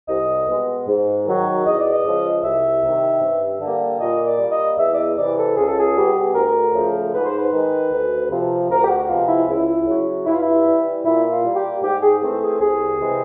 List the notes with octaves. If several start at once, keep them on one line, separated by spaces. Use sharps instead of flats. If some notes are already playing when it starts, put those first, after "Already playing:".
C2 D#5
B2 G#3 B3
G#2
D#3 F#3
E2 D#5
D5
D#5
C#3 F3 G#3
C2 E5
C3 D#3
G2
D3 G3 A#3
A#2 D#5
D5
G3 A#3
D#5
E2 E5
D5
D#5
C3 E3 D5
A4
C#2 G#4
A4
G#4
B2 G3 B3
D2 A#4
C#3 F3 A3
G#2 B4
C5
B4
D#3 G#3
D2
C3 F3
D2 A#4
G4
F#4
C3 F3 G#3 B3 F4
E4
C#2 E4
C#3 F#3
G2 E4
F4
E4
E3 G3
A#2 E4
F4
G3 A#3
G4
G#2 G4
G#4
E3 A3 C4
G#4
C2 G#4
C3 E3 G#3 C4